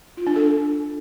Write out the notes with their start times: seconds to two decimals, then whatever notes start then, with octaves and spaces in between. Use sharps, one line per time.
0.17 F4
0.27 D4
0.36 A4